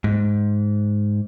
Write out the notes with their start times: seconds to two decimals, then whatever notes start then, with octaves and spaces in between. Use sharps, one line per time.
0.04 G#2